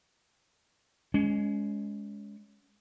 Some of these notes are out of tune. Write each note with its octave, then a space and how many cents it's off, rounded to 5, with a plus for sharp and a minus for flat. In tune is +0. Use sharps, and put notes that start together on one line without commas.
G#3 +0 C#4 +25